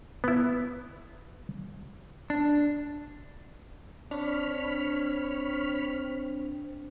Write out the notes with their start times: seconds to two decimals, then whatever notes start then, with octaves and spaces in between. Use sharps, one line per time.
0.24 B3 E4
2.30 D4
4.11 C4 D4 C#5 B5 F6